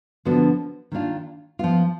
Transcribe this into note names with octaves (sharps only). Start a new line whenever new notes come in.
D3 F3 B3 D4 F#4
D#3 A#3 D4 F4
F3 B3 F4